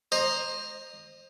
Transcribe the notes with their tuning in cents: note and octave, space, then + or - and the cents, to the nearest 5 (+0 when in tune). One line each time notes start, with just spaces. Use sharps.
C5 +15 D#5 -20 A#5 +0